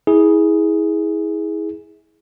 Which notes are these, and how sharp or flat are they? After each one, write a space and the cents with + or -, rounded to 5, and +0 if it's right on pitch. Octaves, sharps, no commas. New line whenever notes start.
E4 -30 G#4 +0